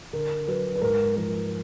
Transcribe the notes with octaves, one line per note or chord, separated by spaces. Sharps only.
D3 A#4
F#3 B4
B4
G#2 A#4
F3 A#4